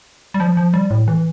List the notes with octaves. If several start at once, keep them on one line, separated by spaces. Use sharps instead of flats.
G3
F3
F3
G3
A2
E3